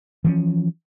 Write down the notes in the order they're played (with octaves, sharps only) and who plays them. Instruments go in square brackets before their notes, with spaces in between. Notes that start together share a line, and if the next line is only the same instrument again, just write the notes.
[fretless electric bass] E3 F3 C#4